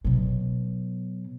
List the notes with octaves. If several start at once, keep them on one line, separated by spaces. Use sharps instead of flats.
B2 F#3